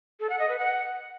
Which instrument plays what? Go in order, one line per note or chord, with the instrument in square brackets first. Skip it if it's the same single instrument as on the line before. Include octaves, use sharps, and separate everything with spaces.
[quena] A4
F#5
D#5
B4
F#5